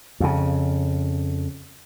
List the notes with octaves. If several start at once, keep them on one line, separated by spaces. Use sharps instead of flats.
F2 C#3